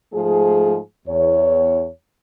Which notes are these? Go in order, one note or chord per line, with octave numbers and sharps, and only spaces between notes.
G#2 F3 A3 G#4
E2 C#5